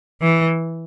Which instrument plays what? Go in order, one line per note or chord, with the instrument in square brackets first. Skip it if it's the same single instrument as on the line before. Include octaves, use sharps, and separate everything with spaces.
[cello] E3